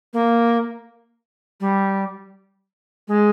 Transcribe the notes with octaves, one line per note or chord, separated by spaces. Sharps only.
A#3
G3
G#3